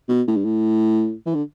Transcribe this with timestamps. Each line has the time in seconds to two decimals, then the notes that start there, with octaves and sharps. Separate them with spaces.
0.09 B2
0.28 A2
0.36 G2
0.45 A2
1.26 E3
1.35 D3